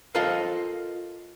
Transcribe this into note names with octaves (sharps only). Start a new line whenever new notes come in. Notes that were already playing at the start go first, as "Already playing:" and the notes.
F4 A4 A#4 C5 D#5 F5